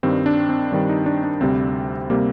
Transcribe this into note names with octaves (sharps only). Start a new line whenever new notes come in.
G2 D#3 G3 C4
D4
C4
G2 D#3 G3 C4
D#4
D4
D4
D2 C3 G3 C4
C3 G3 A#3